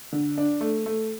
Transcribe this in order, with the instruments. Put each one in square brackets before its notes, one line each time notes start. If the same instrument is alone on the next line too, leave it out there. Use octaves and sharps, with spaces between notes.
[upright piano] D3
D4
A3
A3